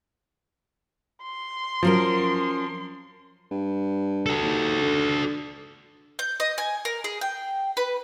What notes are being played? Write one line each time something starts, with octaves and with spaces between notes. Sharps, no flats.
C6
F3 F#3 C#4 A#4
G2
F#4 A4
D#2
D3
G6
D#5
G#5
A#4
G#4
G5
B4